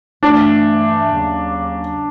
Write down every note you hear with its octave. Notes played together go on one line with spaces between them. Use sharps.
G2 E3 A3 D4
D#2 C#3 F#3 A#3 C#4